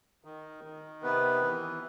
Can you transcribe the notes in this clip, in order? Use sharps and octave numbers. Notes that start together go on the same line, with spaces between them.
D#3
D#3
C3 B3 B4
E3